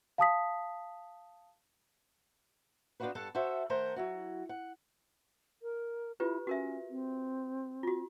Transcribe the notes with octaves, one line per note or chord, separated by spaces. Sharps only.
F5 A5 D#6 B6
B3 D4 D#4 F4 F#4 B4
G2 A4 F#5 A5
F#4 A4 C5 E5
D#3 A3 A#4 C5 F#5 A#5
F#3 E4 F#4
F#5
A#4
E4 F4 G4 B4
C#4 F#4 A#4 E5
C4
F4 F#4